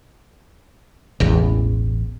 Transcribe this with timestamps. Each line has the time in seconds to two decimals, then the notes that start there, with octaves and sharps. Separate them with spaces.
1.20 E1 A1 E2